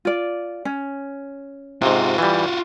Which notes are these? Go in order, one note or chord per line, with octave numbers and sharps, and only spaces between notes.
F4 D5
C#4
G#2 C3 F4 F#4
E3 G3